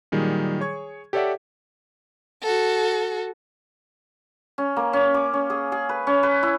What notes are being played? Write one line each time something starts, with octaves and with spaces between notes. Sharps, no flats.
A#2 D#3 F#3 G3 G#4
G#4 C#5 C#6 G#6
G4 A4 C#5 D5 E5 F#5
F#4 A4
C#4
A#3
C#4
D6
C#4
G#4
G#4
B4
C#4
B4
E4